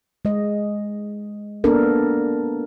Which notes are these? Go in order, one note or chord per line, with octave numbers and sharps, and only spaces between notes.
G#3 D#5
A#3 B3 D4 A4 A#4